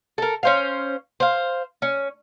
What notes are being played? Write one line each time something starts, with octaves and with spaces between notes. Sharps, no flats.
A4 A#4
C#4 C5 F5
C5 F5
C#4